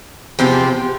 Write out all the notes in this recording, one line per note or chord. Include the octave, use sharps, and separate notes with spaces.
E2 C3 F3 C4 G4